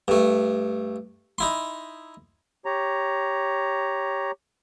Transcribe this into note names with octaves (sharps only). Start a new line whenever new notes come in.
G2 A3
D#4 E4 C6
G4 C#5 A#5